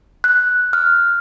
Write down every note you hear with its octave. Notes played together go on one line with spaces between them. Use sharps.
F#6
F6